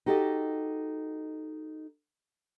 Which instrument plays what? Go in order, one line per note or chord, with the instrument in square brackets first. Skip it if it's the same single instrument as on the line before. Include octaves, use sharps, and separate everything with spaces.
[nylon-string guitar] D#4 F#4 G4 A4 D#5